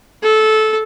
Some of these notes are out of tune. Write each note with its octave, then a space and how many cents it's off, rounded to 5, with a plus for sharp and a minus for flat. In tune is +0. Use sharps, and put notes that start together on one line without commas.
A4 -15